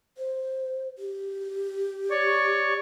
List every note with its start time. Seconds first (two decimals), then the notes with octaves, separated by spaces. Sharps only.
0.18 C5
0.99 G4
2.11 C#5 D5 C#6